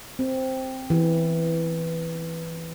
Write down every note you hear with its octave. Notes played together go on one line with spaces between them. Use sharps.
C4
E3